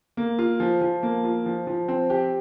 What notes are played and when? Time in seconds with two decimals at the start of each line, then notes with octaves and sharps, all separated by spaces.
0.17 A#3
0.39 F4
0.60 F3
0.81 F3
1.03 A#3
1.24 F4
1.46 F3
1.67 F3
1.88 C4
2.10 G4